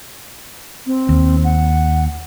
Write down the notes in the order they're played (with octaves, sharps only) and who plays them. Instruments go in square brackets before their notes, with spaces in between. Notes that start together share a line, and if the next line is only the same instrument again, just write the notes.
[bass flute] C4
[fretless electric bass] D#2
[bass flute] F#5